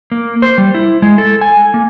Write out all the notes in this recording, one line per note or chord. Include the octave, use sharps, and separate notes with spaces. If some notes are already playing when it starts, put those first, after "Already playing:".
A#3
C5
G3
E4
G#3
A4
G#5
A#3